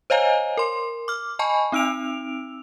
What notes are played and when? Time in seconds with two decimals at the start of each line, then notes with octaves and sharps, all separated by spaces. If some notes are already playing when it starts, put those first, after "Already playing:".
0.10 C5 C#5 D#5 F5 G#5 A#5
0.57 A#4 C6
1.08 D6 F6
1.39 D#5 G#5 A5 B5 C#6
1.72 C4 D#4 E6 D7 F7